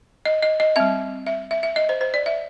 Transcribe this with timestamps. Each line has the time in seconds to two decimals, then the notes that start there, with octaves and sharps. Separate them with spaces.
0.25 D#5
0.43 D#5
0.60 D#5
0.76 G3 C4 E5
1.27 E5
1.51 E5
1.63 E5
1.76 D#5
1.89 C5
2.01 C5
2.14 D5
2.26 E5